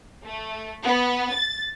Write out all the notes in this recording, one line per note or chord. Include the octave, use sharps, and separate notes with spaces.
A3
B3
A6